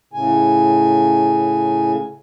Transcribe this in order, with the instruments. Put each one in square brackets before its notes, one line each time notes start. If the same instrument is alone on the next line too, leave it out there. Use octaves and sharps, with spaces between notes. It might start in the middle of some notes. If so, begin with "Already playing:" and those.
[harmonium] A2 C#3 G#5